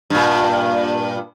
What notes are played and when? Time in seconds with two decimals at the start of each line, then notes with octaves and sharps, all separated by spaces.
0.10 G2 A#2